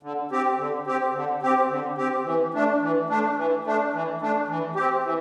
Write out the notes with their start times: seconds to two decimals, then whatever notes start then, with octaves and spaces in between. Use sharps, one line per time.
0.03 D3
0.31 C4 G4
0.59 D3
0.87 C4 G4
1.15 D3
1.43 C4 G4
1.70 D3
1.98 C4 G4
2.25 E3
2.54 A3 D4
2.82 E3
3.09 A3 D4
3.37 E3
3.65 A3 D4
3.93 E3
4.21 A3 D4
4.48 E3
4.76 C4 G4
5.04 E3